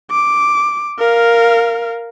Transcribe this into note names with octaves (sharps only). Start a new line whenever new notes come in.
D6
A#4 F5